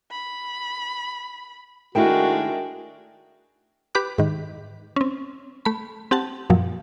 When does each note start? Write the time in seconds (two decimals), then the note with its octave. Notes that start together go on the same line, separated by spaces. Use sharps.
0.11 B5
1.95 D#3 G#3 A3 D4 E4 F#4 A#4 G5
3.95 G4 B4 B5 D6 F#6
4.18 G#2 D#3
4.96 C4 C#4
5.65 A3 B5
6.11 C4 G4 F#5 A5
6.50 F#2 A#2 F3 F#3